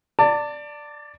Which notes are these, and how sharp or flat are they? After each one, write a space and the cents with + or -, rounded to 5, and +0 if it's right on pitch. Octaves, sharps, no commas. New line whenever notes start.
D5 +0 A5 +35